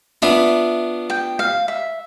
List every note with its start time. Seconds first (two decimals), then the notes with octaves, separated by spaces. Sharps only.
0.22 B3 D4 F4 E5
1.10 G5
1.39 F5
1.68 E5